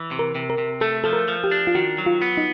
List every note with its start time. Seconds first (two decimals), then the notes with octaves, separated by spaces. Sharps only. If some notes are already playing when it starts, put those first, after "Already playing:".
Already playing: E3
0.11 C3
0.19 A#4
0.35 C3
0.50 A#4
0.58 C3
0.81 A3 A4
1.04 F3 A4
1.13 A#4
1.28 F3
1.44 G4
1.51 D4
1.67 F4
1.75 D#3 F#4
1.98 F#3
2.06 F4
2.22 B3
2.37 D#4